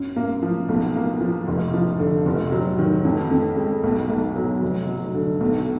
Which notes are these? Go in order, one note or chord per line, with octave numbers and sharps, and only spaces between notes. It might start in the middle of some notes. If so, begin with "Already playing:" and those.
Already playing: F#2
A#3
F3
B1
A#3
F3
F1
F3
D3
F1
F#3
D#3
F2
F2
G#3
B1
B1
F#3
F1
F#3
D3
B1